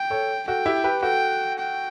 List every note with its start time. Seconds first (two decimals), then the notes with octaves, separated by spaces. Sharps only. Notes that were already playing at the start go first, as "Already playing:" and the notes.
Already playing: G5
0.10 A4 C#5
0.48 F#4 A4 G5
0.66 E4 G4
0.84 G4 B4
1.03 F#4 A4 G5
1.59 G5